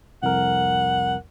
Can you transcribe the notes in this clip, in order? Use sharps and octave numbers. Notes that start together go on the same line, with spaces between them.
C2 F2 A#4 F#5